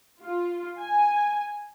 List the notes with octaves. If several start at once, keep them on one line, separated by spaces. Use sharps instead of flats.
F4
G#5